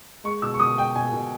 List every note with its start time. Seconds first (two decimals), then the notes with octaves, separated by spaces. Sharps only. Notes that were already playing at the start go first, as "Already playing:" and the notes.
0.24 G#3 C#6
0.42 B2 E6
0.54 C#6
0.59 B2 D#6
0.77 G#3 G5
0.95 B2 G#5
1.13 B2